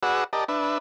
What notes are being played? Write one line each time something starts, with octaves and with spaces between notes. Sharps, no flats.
F#4 G#4 B4 D5 F#5 E6
G4 A#4 D5 D#5 A5
D4 B4 E5